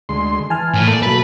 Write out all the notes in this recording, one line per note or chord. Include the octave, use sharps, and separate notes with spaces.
D2 G#3 C6
E3 G#5 A5 F6
A2
A#3 A4 D5
B2 F#3 B4